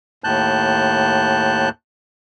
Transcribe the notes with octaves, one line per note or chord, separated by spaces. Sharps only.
D#2 A2 A5 F#6 G6